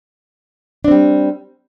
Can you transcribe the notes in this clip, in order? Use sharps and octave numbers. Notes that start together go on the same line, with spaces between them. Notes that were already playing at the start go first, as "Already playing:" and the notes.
G3 C4 D4